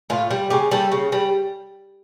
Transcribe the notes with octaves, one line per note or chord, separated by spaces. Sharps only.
A2 F4
G3
C#3 G4
G3 A4
C#3
G3